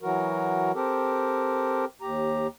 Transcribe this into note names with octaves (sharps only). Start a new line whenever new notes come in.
E3 F#3 F#4 A#4
C4 G4 A4 A#4
D#2 G4 A#5